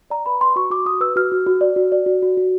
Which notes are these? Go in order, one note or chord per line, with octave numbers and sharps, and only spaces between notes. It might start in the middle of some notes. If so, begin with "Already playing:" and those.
D5 A#5
B4 B5
B4 C6
F#4 C#6
F#4 D6
F#4 D#6
B4 E6
F#4 F6
F#4
F#4
D5
F#4
D5
F#4
F#4
F#4